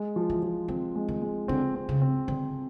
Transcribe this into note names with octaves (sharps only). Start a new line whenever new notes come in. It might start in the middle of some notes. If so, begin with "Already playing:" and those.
Already playing: G#3
F3
E3
F3
D#3 C4
G#3
D#3
G#3
D3 C4
C4
C#3
C4
D3 C4